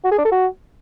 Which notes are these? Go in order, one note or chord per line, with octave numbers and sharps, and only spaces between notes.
F#4
G#4
D4
A4
F#4